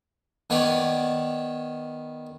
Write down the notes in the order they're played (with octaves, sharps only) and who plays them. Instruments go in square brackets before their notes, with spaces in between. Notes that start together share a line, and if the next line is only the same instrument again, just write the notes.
[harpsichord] D#3 B3 C#5 D5